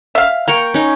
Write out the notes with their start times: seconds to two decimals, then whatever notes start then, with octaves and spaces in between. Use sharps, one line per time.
0.15 E5 F5
0.48 A#3 G5 A#5 C#6
0.74 C#4 D#4